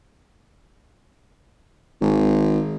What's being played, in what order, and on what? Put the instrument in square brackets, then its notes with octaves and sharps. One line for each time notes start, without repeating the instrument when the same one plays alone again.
[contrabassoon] G#1